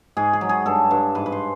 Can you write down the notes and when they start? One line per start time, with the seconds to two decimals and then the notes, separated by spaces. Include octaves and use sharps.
0.17 G#2 G#4
0.33 G#4
0.41 F#3
0.49 G#4
0.66 G2 A4
0.91 G2
1.15 G#2 B4
1.26 B4
1.32 C5